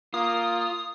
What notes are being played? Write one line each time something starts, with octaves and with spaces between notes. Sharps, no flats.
A#3 F4 D#6